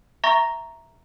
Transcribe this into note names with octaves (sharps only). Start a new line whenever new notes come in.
E5 A#5 C#6 A6 A#6